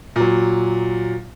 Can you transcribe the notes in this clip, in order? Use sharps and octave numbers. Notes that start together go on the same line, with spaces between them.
A#2 F#3